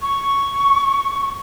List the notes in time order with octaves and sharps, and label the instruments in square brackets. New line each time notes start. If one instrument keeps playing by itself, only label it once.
[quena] C#6